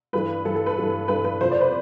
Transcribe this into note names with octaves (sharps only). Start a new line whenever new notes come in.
G2 E3 A3 B4
G2 E3 A3 A4
A4
B4
G2 E3 A3
G2 E3 A3 B4
B4
F2 C3 F3 C5
D5
B4